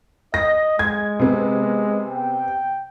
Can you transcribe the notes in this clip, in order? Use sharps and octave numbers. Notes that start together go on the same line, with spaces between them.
D#5 A#6
G#3 G#6
C3 B3
G5